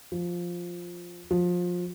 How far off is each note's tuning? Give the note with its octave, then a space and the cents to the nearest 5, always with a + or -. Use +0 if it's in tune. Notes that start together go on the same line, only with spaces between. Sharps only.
F3 +5
F3 +25